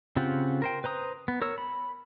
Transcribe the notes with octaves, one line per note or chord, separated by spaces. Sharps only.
C#3 C4 F4 G4 F#5
A#4 C5 G5
B4 C5 A#5 D#6
B3
A#4 C#5 E6
B5